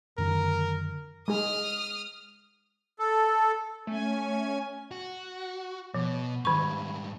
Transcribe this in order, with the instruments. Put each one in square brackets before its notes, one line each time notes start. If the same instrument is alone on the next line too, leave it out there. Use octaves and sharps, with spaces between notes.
[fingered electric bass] F#2 D3 D#3 [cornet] A#4
[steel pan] G#3 G#4 [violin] D#6 F6
[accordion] A4
[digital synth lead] A3 [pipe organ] C#4 G#5
[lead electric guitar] F#4
[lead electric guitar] B2 [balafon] F3
[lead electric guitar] G#2 G3 [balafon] D#3 C#6